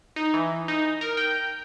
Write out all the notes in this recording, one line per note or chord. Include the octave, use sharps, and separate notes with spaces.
D#4
E3
D#4
A#4
G5